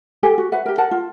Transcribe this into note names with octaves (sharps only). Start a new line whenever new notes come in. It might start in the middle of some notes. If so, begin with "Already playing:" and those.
G4 A4 F#5 G#5
F#4
B4 E5 F#5
G4 A#4
A#4 F#5 A5
F4